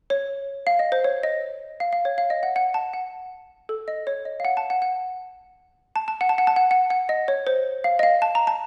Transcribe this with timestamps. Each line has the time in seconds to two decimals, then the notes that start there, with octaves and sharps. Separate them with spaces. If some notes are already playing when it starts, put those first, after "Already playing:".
0.10 C#5
0.67 F5
0.79 D#5
0.92 C5
1.04 C#5
1.23 D#5
1.80 F5
1.93 F5
2.05 C#5
2.18 F5
2.30 D#5
2.43 F#5
2.56 F#5
2.74 A5
2.93 F#5
3.69 A4
3.88 D#5
4.07 C#5
4.25 D#5
4.40 F5
4.45 F#5
4.57 A5
4.70 F#5
4.82 F#5
5.96 A5
6.08 A5
6.21 F#5
6.29 A5
6.38 F#5
6.47 A5
6.56 F#5
6.71 F#5
6.90 F#5
7.09 D#5
7.28 C#5
7.47 C5
7.84 F5
7.99 D#5
8.03 F5
8.22 A5
8.35 A#5
8.47 A5